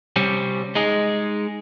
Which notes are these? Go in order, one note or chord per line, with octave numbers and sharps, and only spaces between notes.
C3 G3 C4 C#4
G#3 D#4 G#4